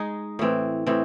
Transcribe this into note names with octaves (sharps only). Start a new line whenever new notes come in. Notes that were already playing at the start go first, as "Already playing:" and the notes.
Already playing: G#3 D#4 G#4
A2 E3 C4
A2 E3 C4